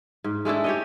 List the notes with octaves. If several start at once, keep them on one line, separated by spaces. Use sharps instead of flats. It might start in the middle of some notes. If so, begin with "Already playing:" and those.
G#2
G#3 A3 D4 E4
G4 C#5 D#5